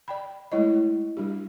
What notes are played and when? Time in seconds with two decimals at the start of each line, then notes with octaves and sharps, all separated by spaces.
0.08 D5 G5 B5
0.52 G#3 A3 E4 C#5 D#5
1.17 G3 D4 G4